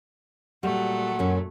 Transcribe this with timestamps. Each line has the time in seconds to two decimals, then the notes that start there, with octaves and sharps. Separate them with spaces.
0.63 A#2 F#3 G3 A3 F#5
1.19 F#2 C#4